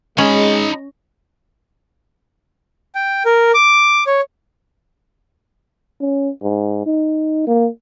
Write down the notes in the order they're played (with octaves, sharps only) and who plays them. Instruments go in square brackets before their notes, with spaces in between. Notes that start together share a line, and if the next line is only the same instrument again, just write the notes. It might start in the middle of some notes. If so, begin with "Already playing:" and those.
[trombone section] G#3 [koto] C#4 [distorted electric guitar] D#4 B5 [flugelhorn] D#5
[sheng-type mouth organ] G5
A#4
D6
C#5
[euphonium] C#4
G#2
D#4
A#3